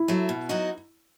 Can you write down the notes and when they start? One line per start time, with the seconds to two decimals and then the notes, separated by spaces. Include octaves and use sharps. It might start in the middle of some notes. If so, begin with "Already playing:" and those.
Already playing: E4
0.08 F#3 A3
0.29 B2
0.49 F#3 B3 D#4 F#4